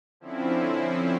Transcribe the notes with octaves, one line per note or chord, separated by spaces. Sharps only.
D3 F3 C4 C#4 E4